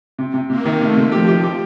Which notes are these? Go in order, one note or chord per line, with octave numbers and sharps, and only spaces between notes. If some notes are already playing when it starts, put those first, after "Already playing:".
C3
C3
C3 A#3
D#3
C3 A3
C3
F3 G4
G4
G4